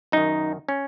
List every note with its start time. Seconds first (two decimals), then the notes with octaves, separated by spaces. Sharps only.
0.12 F#2 D#3 D#4
0.68 C#4